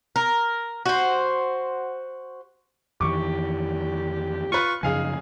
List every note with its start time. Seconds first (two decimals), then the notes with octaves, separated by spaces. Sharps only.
0.16 A#4
0.86 F#4 C5
3.01 F2 D#3 E3 G4 C#6 D6
4.52 F4 B4 C#6
4.83 F#2 C#3 F3 D#4 G#4 F5 G#5